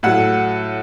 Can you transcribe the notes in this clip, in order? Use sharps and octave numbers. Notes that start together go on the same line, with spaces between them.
A2 F#3 F#5